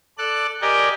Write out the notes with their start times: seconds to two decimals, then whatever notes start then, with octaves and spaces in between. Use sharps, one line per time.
0.18 A4 D5 F#6
0.62 G4 A#4 D5 D#5 G5 G#5